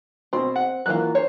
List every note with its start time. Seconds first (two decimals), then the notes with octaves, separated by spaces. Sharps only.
0.33 B2 C4 C6
0.56 F#5
0.86 E3 F#3 A#3 F4 F#6
1.15 C5 C#5